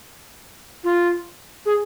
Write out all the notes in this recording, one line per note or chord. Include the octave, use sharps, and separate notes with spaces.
F4
G#4